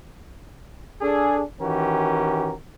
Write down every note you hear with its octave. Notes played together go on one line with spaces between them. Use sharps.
D4 G#4 A4
D#3 E3 C#4 F#4 G4 A#4